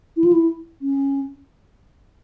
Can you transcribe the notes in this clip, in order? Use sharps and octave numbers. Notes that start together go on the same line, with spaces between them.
E4
F4
E4
C#4